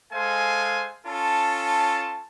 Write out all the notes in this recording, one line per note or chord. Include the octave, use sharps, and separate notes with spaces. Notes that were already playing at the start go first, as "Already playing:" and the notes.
G#3 A4 C5 F5 G#5
C#4 F4 A4 A5